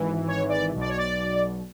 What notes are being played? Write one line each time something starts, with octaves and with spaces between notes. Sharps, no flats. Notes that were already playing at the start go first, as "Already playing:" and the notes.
Already playing: G#1 G#2 E3
C#5
D5
B1 B2
D5
C#5
D5